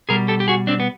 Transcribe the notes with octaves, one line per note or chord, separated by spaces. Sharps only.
B2 G3 G#4 A#4
G4 A4
G4
F#4 G#4
C4 D4
B3